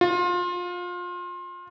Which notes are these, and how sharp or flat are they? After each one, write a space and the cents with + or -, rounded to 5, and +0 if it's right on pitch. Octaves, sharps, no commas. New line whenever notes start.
F4 +25